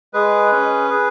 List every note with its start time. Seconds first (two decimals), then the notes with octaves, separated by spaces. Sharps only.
0.14 G#3 G#4 B4
0.52 C#4
0.90 G#4